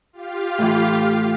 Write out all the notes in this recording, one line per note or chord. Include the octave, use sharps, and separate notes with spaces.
F4 G4 F5
A2 E3